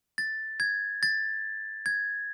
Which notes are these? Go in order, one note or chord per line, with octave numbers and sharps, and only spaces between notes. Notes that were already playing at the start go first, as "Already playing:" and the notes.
A6
G#6
A6
G#6